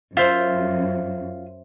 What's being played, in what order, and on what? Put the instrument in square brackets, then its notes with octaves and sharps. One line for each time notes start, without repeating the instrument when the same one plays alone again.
[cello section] F#2 [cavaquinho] F4 [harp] C5 E5